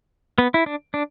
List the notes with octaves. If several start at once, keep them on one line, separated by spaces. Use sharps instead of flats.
B3
E4
D4
D4